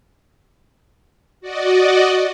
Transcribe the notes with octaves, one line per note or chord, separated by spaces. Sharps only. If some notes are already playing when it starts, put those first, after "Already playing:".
F#4 D5 D#5